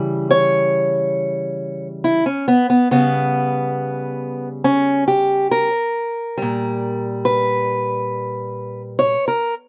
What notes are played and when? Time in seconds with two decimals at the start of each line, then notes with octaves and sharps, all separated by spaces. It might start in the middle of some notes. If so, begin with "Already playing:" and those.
Already playing: C#3 E3 G3
0.31 C#5
2.04 E4
2.26 C#4
2.48 B3
2.70 B3
2.91 C#3 G3 B3
4.64 C#4
5.08 G4
5.51 A#4
6.38 A#2 G3
7.25 B4
8.99 C#5
9.28 A#4